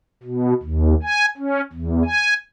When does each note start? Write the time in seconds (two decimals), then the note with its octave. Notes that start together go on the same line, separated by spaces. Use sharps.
0.23 B2
0.63 D#2
1.03 G#5
1.37 C#4
1.73 E2
2.05 G#5